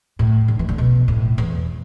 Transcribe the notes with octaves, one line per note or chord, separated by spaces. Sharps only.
A2
D3
E3
D3
B2
A2
E2